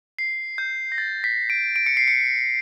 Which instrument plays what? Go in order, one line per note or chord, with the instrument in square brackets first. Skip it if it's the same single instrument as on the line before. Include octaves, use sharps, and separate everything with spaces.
[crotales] C7
G6
A#6
A6
B6
D7
D7
C#7
C7
C#7